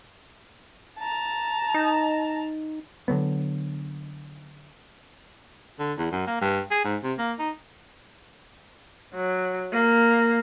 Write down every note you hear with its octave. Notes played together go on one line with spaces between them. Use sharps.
A5 A#5
D#4
D3 D#3 F#3 B3
D3
E2
F#2
A#3
G2
G#4
G#2
C3
A#3
D#4
F#3
A#3